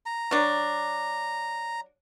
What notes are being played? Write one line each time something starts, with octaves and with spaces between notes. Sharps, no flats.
A#5
F#3 D4